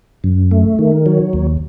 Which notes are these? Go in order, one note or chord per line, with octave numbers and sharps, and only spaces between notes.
F#2
A3
D#3
F#3
D#2